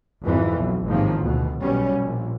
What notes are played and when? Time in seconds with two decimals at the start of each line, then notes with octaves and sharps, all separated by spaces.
0.23 G#1 F2 E3
0.56 B1
0.87 A1 G#2 C3 D#3 F3 A#3
1.20 D2 B2
1.61 B1 B2 G3 C#4
1.97 A#1